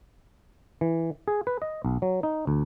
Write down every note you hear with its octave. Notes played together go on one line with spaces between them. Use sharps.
E3
G#4
B4
D#5
B1
F#3
D#4
D2